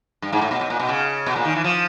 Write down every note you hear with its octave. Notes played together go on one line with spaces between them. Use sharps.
G2
G#2
A2
B2
B2
A#2
B2
C#3
B2
A#2
D#3
E3
F3